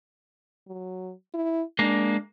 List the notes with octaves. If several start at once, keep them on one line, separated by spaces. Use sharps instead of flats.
F#3
E4
G#3 A#3 D4